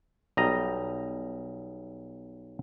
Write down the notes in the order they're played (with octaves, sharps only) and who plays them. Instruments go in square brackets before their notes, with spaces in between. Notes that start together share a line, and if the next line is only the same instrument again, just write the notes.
[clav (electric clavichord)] B1 G3 D#5 A#5